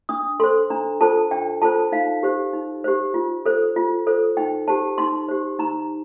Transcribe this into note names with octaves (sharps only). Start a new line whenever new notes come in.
D4 D#6
A4 C5 C6
D4 A#5
F4 A4 C5 A5
D4 G5
F4 A4 C5 A5
D#4 F5
G4 C5
D#4
G4 C5
F4
A4 C5
F4
A4 C5
D#4 G5
G4 C5 A5
D#4 C6
G4 C5
D#4 A#5